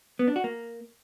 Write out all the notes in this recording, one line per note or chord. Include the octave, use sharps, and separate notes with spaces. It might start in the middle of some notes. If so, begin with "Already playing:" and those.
B3
D4
F#4
A#3